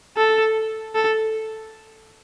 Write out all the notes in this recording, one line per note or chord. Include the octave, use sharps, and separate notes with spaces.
A4
A4